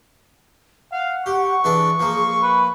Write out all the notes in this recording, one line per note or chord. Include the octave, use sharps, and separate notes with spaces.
F5 F#5
G4 C#6
E3 D4 G#4 A4
F3 A#3
B4